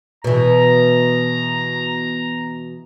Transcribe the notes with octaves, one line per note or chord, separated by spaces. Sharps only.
B2 E3 A#5